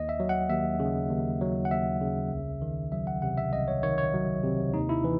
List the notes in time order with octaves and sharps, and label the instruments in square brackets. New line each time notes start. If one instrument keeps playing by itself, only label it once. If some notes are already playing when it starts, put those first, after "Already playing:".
Already playing: [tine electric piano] D#2 D#5
E5
F#3
F#5
D#2 E5
C#3
D#2
F#3
F#5
D#2 E5
C#3
C2
D#3
F#3 E5
F#5
C3 F#5
E5
C2 D#5
C#5
D#3 C#5
C#5
F#3
C3
D#2 D#4
E4
E3